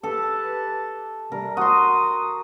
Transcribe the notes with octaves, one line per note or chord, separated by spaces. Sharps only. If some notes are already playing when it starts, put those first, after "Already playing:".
G4 A4 B4 A5
C3 G3 A#4
F#4 C6 D#6